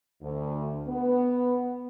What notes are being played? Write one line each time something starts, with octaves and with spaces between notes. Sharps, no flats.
D2
B3